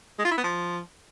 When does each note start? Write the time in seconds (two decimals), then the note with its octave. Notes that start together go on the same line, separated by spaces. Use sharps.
0.18 G#3
0.25 F4
0.31 E4
0.37 B3
0.44 F3